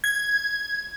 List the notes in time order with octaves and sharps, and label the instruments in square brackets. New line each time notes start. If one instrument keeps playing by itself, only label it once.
[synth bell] G#6